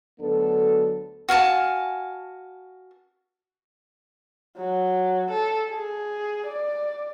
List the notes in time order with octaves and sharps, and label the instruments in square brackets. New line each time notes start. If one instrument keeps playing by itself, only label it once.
[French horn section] D2 F#3 B3 D4 A4
[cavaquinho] F#4 F5 G#5 A5
[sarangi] F#3
A4
G#4
D5